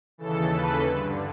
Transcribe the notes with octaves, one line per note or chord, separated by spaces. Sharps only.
D#2 C#3 E3 A4
B4
G2 D3